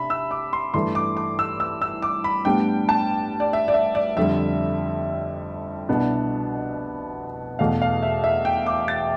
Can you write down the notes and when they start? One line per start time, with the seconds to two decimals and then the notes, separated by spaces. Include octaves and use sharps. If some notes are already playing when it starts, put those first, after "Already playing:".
Already playing: C3 D4 E5 B5
0.10 E6
0.31 D6
0.53 C6
0.74 G2 E3 A3 E4 C6
0.95 D6
1.17 D6
1.39 E6
1.60 E6
1.82 E6
2.02 D6
2.24 B5
2.45 A2 G3 B3 D4 G5
2.89 A5
3.40 D5
3.53 E5
3.68 D5
3.74 E5
3.95 D5
4.17 F2 D3 G3 E5
5.89 C2 B2 B3 D4
7.59 E2 B2 A3 F5
7.82 F5
8.02 E5
8.24 E5
8.45 G5
8.66 D6
8.88 A6